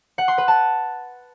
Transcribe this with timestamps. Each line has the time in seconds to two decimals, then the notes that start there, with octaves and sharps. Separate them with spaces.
0.18 F#5
0.28 C6
0.38 B4
0.48 A5